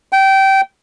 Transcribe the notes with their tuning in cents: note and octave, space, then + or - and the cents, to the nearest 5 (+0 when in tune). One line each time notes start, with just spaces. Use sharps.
G5 -20